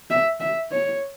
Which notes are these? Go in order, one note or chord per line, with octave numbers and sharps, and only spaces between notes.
E5
E5
C#5